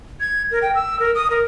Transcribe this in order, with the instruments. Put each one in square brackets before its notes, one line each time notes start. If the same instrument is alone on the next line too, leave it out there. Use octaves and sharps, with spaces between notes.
[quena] G#6
A#4
G5
E6
A#4
D#6
A#4